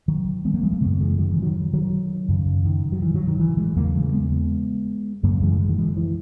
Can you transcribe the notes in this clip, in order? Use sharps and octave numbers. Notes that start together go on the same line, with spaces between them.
D#3 F#3
G#3 B3
F#3 A#3
E3 G#3
F#3 A#3
F#2 C#3 G#3 B3
E3 G#3
D#3 F#3
E3
D#3 F#3
D#3 F#3
F#2 C#3
D#3
F#3
E3
D#3 F#3
D#3
E3
E3 G#3
E2 C#3 F#3 A#3
E3 G#3
G#3 B3
F#2 C#3 F#3 A#3
E3 G#3
E3 G#3
D#3 F#3
E3 G#3
E3